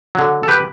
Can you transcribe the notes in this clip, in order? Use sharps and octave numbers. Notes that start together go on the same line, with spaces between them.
D3 F#3
A4
G4 B4